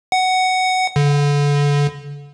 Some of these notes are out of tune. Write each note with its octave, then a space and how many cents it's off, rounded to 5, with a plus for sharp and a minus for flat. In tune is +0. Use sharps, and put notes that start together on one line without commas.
F#5 +10
D3 -30